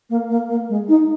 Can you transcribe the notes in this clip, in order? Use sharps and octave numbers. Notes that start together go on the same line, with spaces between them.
A#3
A#3
A#3
G#3
D#4